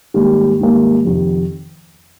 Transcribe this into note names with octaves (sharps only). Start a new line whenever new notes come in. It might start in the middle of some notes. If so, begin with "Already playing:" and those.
G#2 D#3 G3 A#3
G#2 D#3 G3 A#3
F2 C3 D#3